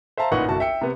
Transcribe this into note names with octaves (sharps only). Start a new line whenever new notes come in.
C5 E5 F5 A5 A#5
A1 A#2 D#4 B4 F#5 C#6
G1 C2 F#4 A5
E5 G5 C#7
C3 B3